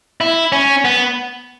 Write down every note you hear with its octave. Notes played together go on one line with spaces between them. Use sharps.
E4
C#4
B3